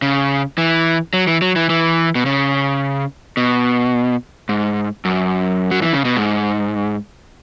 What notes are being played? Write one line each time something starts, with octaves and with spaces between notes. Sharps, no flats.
C#3
E3
F#3
E3
F#3
E3
E3
B2
C#3
B2
G#2
F#2
F#3
E3
C#3
B2
G#2